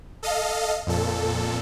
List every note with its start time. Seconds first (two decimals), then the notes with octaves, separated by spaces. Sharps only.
0.23 A4 D#5 F5
0.87 F2 A#2 A4